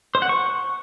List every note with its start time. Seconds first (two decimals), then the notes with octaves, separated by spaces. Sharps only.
0.15 C5
0.22 F#5
0.29 C#6